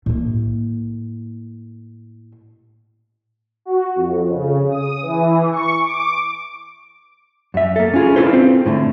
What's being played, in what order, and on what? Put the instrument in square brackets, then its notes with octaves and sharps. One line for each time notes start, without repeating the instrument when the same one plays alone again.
[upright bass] A2 A#3
[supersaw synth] F#4
F2
C#3
D#6
E3
C#6
D6
[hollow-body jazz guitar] F#2 E5
A#3 A4
C#4 F4 G#4
D4 E4 F4 A4 B4 C5
C4
A2 D3 A3